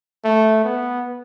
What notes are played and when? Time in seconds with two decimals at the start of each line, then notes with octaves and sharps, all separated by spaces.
0.24 A3
0.64 B3